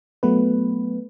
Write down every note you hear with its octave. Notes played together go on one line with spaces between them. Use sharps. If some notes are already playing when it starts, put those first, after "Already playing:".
F#3 A3 B3 B4